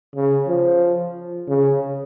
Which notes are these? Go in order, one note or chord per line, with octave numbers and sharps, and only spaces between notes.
C#3
F3
C#3